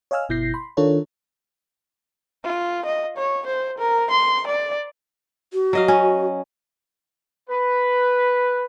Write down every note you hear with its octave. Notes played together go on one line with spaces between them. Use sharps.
C#5 D#5 F5 G#5 E6 F6
G1 B2 E4 G6 A#6 C7
B5 C6
D#3 D4 F4 A4 A#4 C#5
F4
D#5
C#5
C5
A#4
C6
D5
F#4
F#3 D#5 F5
C#4
B4